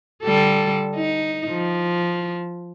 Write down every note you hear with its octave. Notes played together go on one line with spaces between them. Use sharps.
D3 G3 A4
D#4
F3